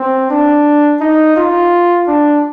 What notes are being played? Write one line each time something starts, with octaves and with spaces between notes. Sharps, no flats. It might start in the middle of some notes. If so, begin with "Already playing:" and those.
Already playing: C4
D4
D#4
F4
D4